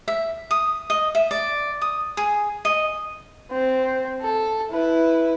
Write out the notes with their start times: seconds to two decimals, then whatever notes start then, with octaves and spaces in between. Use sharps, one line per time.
0.08 E5
0.51 D#6
0.90 D#5
1.15 E5
1.31 D5
1.82 D#6
2.17 G#4
2.65 D#5
3.51 C4
4.21 A4
4.71 E4 B4